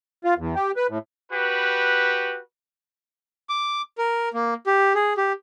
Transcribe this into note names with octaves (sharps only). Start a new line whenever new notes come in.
F4
E2
G4
B4
A2
F#4 G4 B4
D6
A#4
A#3
G4
G#4
G4